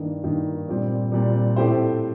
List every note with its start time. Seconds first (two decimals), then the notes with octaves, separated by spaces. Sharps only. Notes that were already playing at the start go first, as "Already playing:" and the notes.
Already playing: G2 D#3 A#3
0.23 G2 D#3 A#3
0.68 A#2 G3 C4
1.12 A#2 G3 C4
1.56 A2 A3 C4 G4 C5